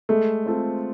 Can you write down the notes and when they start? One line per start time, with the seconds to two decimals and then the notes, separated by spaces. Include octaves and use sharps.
0.09 G#3 A3
0.46 C4 F4 A4